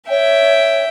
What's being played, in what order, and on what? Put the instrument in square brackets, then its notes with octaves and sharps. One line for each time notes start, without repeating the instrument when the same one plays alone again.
[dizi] C#5 [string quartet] E5 G5